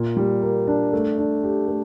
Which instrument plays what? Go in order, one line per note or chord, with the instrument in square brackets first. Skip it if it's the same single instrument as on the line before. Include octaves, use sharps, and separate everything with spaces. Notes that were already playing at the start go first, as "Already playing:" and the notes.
Already playing: [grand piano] A#2
G3
A#3
D4
A3
D4
G4
A3